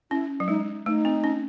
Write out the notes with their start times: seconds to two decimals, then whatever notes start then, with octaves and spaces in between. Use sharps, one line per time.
0.11 C#4 E4
0.40 F#3
0.48 G#3 D#4
0.86 A3 D#4
1.05 C4
1.24 C#4